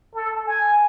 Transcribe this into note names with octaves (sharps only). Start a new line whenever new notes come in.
A4
G#5